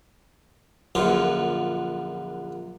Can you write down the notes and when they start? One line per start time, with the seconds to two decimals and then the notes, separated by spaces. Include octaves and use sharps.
0.95 A#1 F#2 D3 F4